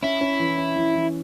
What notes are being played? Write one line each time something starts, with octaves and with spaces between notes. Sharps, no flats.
C#4 E4
C#4
E3
C#4
E3
E3